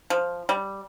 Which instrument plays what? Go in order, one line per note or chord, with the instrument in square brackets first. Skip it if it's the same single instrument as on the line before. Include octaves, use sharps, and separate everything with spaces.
[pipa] F3
G3